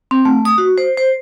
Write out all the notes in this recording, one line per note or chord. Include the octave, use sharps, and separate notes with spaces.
C4
A3
D#6
F#4
C5
C5